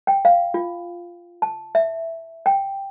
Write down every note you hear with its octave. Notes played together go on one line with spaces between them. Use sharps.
G5
F5
F4
A5
E5
G5